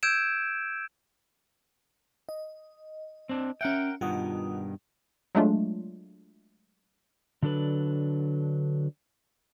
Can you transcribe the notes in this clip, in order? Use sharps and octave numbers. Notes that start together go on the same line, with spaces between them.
E6 G6 G#6 D7 E7
D#5
C4 D4
C#4 A#4 E5 F#5 G5
G2 B2 D#3 F4 F#5 D#6
F#3 G#3 A3 D4 F4
D3 F#3 D4 A4 B4